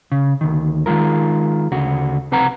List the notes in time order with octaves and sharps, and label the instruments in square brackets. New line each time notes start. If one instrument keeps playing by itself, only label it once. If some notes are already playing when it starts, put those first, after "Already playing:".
[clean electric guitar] C#3
D2 D#3
D#3 E3 G#3 F4 A#4
D2 C#3 F#4
C2 C4 B4 F#5 A#5